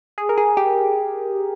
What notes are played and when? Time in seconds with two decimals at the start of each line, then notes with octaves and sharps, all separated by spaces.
0.18 G#4
0.29 A#4
0.38 G#4
0.57 G4